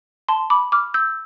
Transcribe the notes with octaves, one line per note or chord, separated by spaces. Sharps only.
A5 C6
B5 D6
D6 F6
E6 G6